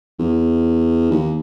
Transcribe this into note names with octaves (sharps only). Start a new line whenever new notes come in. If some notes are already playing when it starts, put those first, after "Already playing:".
E2
D#2